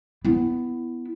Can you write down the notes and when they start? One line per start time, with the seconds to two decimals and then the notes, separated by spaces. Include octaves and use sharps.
0.25 B3 E4